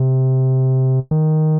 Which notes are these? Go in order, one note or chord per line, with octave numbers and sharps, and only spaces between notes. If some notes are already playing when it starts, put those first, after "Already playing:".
Already playing: C3
D#3